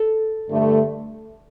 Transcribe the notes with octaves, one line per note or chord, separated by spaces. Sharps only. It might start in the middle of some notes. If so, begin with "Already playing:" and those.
Already playing: A4
G2 D3 A3